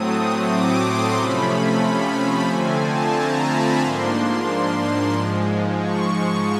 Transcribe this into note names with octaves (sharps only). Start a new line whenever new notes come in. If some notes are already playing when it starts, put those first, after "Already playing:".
Already playing: A2 F#3 A3 C4 D#6
D6
C6
C3 F3 A3 C#4 B5
D3 F3 A3 C4 G#5
A5
A#5
B5
G#2 F3 A#3 D4 C6
G#2 F3 G#3
C#6